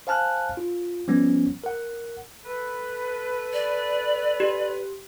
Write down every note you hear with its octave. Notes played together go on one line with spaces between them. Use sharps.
C5 F5 G#5 A5 F6 F#6
F4
F3 G3 B3 C#4
A#4 F#5
A4 B4
D5
G4